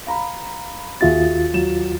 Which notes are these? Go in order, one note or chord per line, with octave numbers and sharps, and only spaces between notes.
F5 A#5 B5
D#2 F4 F#4 G#4 E5 A6
F#3 E7